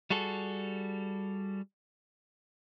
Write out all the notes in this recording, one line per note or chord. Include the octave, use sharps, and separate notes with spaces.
G3 F#4 G#4 A4